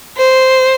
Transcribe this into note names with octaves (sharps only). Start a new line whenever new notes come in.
C5